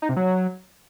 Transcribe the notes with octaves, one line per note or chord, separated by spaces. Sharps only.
D#4
C3
F#3